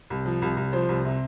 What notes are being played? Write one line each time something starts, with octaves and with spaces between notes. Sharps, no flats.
C2
F3
C2
C2
F3 C5
C2
C3